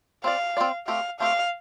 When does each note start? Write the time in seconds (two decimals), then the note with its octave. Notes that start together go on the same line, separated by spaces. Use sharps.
0.24 C4 F4 D5 F5
0.57 C4 F4 D5
0.88 A3 C4 G4 F5
1.20 A3 C4 G4 F5